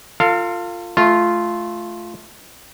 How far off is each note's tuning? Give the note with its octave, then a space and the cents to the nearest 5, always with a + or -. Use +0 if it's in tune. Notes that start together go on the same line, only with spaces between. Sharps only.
F4 +0 A4 +40 F5 +0
A3 -20 F4 -5